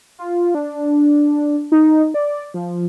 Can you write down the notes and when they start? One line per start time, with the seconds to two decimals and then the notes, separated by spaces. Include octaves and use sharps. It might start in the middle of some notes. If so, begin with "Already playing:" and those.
0.19 F4
0.55 D4
1.72 D#4
2.14 D5
2.54 F3